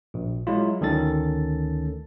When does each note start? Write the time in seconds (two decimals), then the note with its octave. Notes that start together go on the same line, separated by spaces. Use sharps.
0.14 A#1
0.47 F#3 G#3 E4 F4
0.81 D2 D#3 C#4 A4 A6